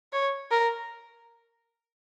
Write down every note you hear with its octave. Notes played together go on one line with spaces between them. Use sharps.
C#5
A#4